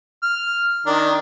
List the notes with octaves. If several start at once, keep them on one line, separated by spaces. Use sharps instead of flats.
F6
D#3 D4 A#4